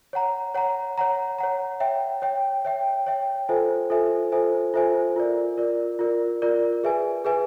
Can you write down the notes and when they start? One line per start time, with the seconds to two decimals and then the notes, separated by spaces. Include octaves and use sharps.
0.13 C#5 F#5 A#5
0.55 C#5 F#5 A#5
0.98 C#5 F#5 A#5
1.39 C#5 F#5 A#5
1.80 C#5 E5 G5
2.22 C#5 E5 G5
2.65 C#5 E5 G5
3.07 C#5 E5 G5
3.49 F4 A4 C5 E5 G#5
3.90 F4 A4 C5 E5 G#5
4.32 F4 A4 C5 E5 G#5
4.74 F4 A4 C5 E5 G#5
5.16 F4 A#4 D5
5.58 F4 A#4 D5
5.99 F4 A#4 D5
6.42 F4 A#4 D5
6.84 G#4 B4 E5 G#5
7.25 G#4 B4 E5 G#5